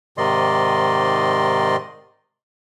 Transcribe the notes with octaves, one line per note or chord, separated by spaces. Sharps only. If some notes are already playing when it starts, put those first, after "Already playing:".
G#2 C3 D#3 D5 D#5 C6